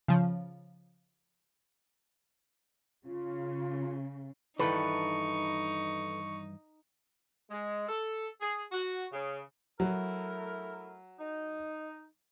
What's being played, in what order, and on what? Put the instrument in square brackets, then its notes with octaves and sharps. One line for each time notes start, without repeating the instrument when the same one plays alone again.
[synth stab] C#3 F3
[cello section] C#3 [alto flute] F4
[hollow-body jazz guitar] G2 D#3 E3 [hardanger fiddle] D#4 [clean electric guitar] A4 B4 [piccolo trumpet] C#6
[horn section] G#3
A4
G#4
F#4
C#3
[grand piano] F#3 [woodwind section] A3 E4 A#4
[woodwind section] D#4